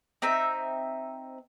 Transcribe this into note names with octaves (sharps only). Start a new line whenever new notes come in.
C4 D#4 E5 G5